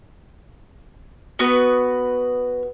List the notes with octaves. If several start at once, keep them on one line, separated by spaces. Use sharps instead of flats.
B3 F#4 B4